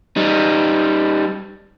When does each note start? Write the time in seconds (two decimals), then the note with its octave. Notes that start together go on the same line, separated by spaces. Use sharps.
0.16 G3 D#4